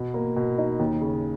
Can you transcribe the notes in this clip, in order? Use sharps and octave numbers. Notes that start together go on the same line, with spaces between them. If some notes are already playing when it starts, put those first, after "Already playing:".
Already playing: B2
A#3
B2
D#4
D#2
C#3